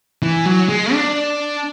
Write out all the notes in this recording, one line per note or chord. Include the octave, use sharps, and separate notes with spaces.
E3
F#3
G#3
D4